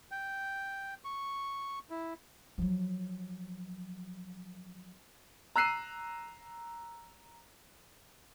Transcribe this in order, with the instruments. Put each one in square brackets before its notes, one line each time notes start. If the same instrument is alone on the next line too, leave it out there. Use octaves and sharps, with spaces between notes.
[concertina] G5
C#6
E4
[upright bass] F3 F#3
[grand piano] A#5 E6 F#6 C7 D#7